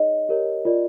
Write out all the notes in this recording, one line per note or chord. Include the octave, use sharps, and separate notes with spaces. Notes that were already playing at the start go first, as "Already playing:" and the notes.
Already playing: D#4 G#4 C#5 D#5
G4 A#4 C#5
F4 A#4 D5